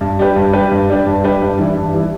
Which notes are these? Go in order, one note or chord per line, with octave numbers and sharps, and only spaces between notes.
G2
G3 D4 G4 B4
G2
G3 D4 G4 B4
G2
G3 D4 G4 B4
G2
G3 D4 G4 B4
G2
E3 G3 E4
G2
E3 G3 E4